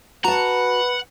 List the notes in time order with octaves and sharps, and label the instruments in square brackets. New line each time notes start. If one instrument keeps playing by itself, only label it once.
[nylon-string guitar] F#4 A5 [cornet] B4 [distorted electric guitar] F#5 [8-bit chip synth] A#5